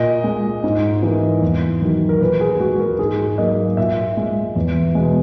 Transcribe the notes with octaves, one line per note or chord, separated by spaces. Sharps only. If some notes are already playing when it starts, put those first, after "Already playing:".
Already playing: A#2 D#5
G#3
G#2
E3 A#3
E2
D#3 F#3
A#4
A#2 B4
G#4
G#3 F#4
A#4
G#2 G#4
F#3 A#3 D#5
A#2 E5
G#3
E2
B2 G#3